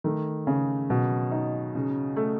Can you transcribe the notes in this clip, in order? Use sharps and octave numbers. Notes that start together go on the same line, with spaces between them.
D#3 A3
C#3 G#4
B2 F#3
D#4
C#3
A3